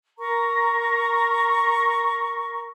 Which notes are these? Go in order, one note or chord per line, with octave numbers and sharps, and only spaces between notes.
A#4 A#5 C#6